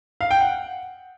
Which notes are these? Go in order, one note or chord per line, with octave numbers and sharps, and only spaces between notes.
F5
G5
F#5